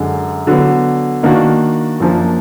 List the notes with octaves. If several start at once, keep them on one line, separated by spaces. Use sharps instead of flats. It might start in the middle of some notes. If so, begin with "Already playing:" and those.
Already playing: F#2 D3 G#3
D3 F#3 B3
D#3 A#3 D4 F#4
F#2 F3 A#3 D4